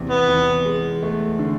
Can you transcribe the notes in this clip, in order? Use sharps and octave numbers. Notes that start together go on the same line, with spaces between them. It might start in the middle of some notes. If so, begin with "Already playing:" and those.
Already playing: E2 C3
B3
E2
G#3
A3
D3